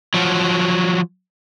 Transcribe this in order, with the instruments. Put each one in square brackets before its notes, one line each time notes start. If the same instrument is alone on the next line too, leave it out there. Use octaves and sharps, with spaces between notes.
[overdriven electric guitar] F3 F#3